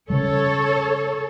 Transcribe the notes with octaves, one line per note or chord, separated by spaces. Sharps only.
C#3 G3 A4 C#5